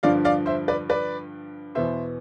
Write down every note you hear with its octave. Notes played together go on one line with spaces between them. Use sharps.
G2 D3 F3 D5 F5
D5 F5
C5 E5
B4 D5
B4 D5
E2 B2 B3 C5 E5